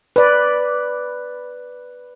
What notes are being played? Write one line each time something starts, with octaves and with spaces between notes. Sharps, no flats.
B4 D5